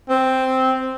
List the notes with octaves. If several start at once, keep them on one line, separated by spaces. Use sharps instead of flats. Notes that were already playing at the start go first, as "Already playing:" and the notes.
C4